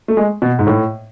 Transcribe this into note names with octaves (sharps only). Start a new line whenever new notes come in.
A3
G#3
B2
G#2
A2